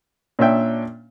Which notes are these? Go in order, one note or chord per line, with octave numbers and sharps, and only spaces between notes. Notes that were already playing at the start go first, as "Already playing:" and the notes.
A#2 C#4 D4 E5 G5